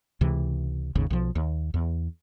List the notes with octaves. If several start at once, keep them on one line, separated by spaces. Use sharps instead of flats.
C#2 C3 E3
G#1 D#2 C#3
B1 F3
D#2
E2